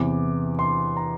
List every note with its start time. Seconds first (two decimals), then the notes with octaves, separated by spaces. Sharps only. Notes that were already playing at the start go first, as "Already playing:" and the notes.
Already playing: E2 C3 E3 D6
0.59 C6
0.97 A#5